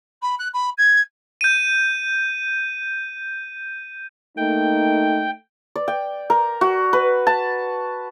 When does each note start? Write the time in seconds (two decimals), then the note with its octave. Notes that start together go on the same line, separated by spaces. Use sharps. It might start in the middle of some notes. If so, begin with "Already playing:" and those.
0.22 B5
0.39 F#6
0.53 B5
0.78 G#6
1.41 G6 D#7
4.37 A3 A#3 D#4 G5
5.76 D5
5.88 G5
6.30 A#4
6.61 F#4
6.93 B4
7.27 A5